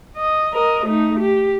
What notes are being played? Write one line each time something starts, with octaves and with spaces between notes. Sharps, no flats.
D#5
A#4 D#5
A3 D#4
G4